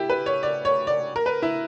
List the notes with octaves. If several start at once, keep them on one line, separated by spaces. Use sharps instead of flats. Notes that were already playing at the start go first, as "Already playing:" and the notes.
Already playing: E4 G4
B4
C#5
D5
C#5
D5
A#4
B4
E4